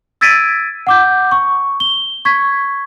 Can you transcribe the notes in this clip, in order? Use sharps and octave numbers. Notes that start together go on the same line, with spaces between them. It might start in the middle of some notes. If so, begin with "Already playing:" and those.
E6 G#6 A6 B6 D7 D#7
F#5 D6 G6
C#6
G7
C#6 G#6 B6